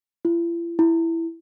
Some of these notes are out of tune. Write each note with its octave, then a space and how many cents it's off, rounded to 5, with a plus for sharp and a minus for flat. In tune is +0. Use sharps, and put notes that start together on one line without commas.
E4 +45
E4 +5